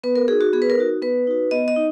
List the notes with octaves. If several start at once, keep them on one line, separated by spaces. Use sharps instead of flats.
B3 B4
A#4
D#4 F#4 G#4
F#4
B3 G#4
B4
A#4
D#4 F#4
B3 B4
D#4 F#4
B3 D#5
D#5
D#4